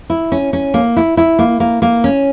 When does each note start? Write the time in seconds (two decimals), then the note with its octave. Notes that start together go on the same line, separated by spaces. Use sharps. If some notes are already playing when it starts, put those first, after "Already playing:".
0.10 E4
0.32 C#4
0.53 C#4
0.74 A#3
0.97 E4
1.17 E4
1.39 A#3
1.60 A#3
1.82 A#3
2.04 C#4